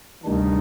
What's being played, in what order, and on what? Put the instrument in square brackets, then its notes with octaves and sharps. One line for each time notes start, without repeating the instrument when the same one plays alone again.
[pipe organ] D2 C3 G3 D4 [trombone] D#3